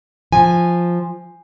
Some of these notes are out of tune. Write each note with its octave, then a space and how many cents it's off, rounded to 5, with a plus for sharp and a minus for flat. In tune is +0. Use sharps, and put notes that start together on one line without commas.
F3 +0 G#5 -10